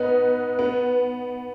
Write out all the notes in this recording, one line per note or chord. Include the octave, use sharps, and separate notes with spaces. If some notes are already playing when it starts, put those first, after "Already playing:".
Already playing: B3 D#4 B4
B3